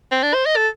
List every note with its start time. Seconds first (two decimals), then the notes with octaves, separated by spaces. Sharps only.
0.11 C4
0.23 D4
0.34 C5
0.46 D#5
0.56 A4